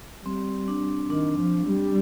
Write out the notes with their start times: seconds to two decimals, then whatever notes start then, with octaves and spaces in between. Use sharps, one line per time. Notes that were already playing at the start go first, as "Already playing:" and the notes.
0.25 G3 C4
0.68 D4
1.09 D#3 D4
1.38 F3
1.66 G3